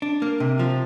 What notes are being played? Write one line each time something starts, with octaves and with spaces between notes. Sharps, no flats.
D4
A#3
C3
F3